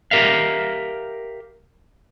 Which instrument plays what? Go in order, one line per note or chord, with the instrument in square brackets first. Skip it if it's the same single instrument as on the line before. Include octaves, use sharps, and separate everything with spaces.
[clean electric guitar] G4 A#4 E5 F5